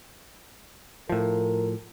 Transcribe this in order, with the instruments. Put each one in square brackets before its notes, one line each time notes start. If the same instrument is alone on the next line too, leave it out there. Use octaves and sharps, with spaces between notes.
[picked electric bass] A2 F3 [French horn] A#4